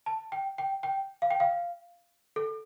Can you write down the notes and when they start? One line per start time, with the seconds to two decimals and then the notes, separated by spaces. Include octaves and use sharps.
0.06 A5
0.32 G5
0.58 G5
0.83 G5
1.22 F5
1.31 G5
1.40 F5
2.36 A4